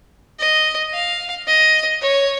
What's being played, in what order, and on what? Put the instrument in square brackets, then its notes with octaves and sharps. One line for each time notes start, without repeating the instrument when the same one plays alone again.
[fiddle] D#5
F5
D#5
C#5